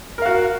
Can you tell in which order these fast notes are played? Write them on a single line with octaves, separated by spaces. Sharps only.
A#4 F5 F#4